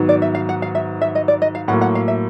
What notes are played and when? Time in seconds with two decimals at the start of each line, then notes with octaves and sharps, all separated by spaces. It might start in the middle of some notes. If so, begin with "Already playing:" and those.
Already playing: G#2 D#3 F#3 B3
0.09 D5
0.22 E5
0.35 F5
0.49 F#5
0.62 F5
0.75 E5
1.01 E5
1.15 D#5
1.28 D5
1.42 D#5
1.55 F5
1.68 A2 F#3 A#3 F#5
1.81 F#5
1.95 F5
2.08 E5